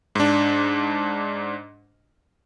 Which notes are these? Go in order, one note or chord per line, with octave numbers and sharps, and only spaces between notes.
G#2 D4